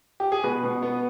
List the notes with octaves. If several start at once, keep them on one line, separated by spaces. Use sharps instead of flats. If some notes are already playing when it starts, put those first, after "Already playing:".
G4
G#4
B2 B4
B2
B3